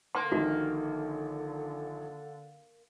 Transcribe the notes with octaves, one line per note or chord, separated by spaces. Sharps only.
D3 A#3 C6
A#1 D#3 F#4